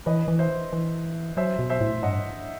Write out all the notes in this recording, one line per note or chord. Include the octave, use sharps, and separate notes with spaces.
E3 B4 D#5
E3
C5 E5
E3
F#3 C5 E5
B2
C5 E5
A2
G2 D#5 F#5